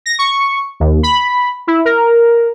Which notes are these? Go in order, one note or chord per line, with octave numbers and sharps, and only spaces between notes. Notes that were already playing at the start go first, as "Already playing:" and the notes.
A#6
C#6
D#2
B5
E4
A#4